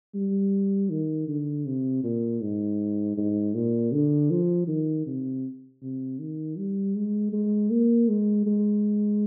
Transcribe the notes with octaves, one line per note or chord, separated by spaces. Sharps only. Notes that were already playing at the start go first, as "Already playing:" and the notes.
G3
D#3
D3
C3
A#2
G#2
G#2
A#2
D3
F3
D#3
C3
C3
D#3
G3
G#3
G#3
A#3
G#3
G#3